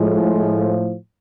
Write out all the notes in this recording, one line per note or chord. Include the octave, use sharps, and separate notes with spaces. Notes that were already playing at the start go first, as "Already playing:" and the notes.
Already playing: A2 F3 G#3